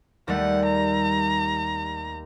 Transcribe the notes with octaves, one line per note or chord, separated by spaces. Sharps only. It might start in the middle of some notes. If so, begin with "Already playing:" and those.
D#2 G3 A3 F#5
A#5